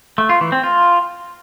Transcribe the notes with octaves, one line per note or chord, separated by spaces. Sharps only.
A3
F4
E3
C4
F4